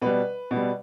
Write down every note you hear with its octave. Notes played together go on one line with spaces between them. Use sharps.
B2 G3 B4
B2
G3